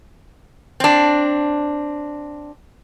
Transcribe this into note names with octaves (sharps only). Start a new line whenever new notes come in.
C4 D4